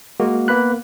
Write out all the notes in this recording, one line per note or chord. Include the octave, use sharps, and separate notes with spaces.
G#3 A#3 F#4
A#3 B3 B5 F#6